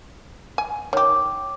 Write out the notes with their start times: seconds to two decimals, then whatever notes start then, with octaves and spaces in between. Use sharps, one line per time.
0.58 G#5
0.93 D#3 G4 C#5 D6